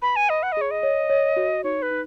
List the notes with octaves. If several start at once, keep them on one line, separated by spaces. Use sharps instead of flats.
B4 B5
G#5
D#5 B5
F#5
D#5
G#4 C#5
D#5
C#5
C#5
F#4
D#4 C#5
B4
D#4